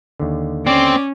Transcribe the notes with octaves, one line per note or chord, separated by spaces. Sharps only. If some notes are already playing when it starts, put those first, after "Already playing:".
D#2 D3
C4 C#4 D5